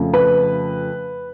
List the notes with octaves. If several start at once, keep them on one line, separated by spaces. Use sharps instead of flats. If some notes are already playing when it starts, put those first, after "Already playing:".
Already playing: F2 C#3 F3 A3
B4